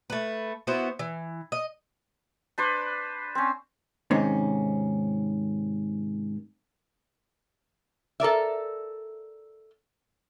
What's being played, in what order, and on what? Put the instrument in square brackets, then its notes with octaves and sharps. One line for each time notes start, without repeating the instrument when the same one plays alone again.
[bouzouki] A3 B4
B3 E4 F#4 C5
E3
D#5
[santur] D4 B4 C5 D5
C4 C#4
[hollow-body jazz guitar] G#2 C3 D#3 C4 C#4
[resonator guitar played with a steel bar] A4 A#4 D5 E5